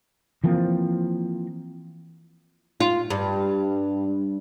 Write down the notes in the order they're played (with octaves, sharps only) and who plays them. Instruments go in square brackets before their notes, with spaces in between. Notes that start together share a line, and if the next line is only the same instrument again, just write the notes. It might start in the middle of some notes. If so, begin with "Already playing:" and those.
[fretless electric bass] E3 F3 A#3 C4
[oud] F4
G2